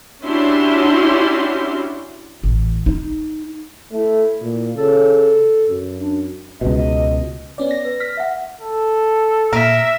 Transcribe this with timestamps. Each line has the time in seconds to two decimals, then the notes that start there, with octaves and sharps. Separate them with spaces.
0.23 C#4 D4 E4 F#4 G4 C6
2.44 A1
2.86 D#4
3.91 A3 E4
4.42 A#2
4.76 C#3 A4
5.69 F#2
5.99 D4
6.61 C#2 B2 D#5
7.58 B3 C#4 D5
7.71 A#6
7.85 B4
8.00 F6 B6
8.17 E5 F#5
8.60 A4
9.53 A#2 A#4 E5